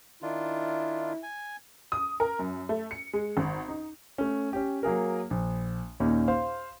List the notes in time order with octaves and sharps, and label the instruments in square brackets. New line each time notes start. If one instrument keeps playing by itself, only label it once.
[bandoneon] D#3 D4 F4 [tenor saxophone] E4
[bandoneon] G#5
[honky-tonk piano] D#6
A#4
F#2
A3
C#7
G#3
G#1
D#4
[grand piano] A3 C#4
C#4 G4
F#3 A#3 G#4 A#4
A#1
D#2 A#2 C#4 D#4
C5 F5 C6